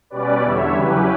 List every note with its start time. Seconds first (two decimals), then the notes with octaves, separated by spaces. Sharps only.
0.10 B2 G3 C#4 B4 D5
0.42 E2 D3 G3 C#5 E5
0.74 C#3 F#3 C#4 E4 G4 B4